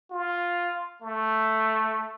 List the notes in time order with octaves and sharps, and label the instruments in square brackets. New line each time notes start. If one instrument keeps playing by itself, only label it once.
[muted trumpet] F4
A3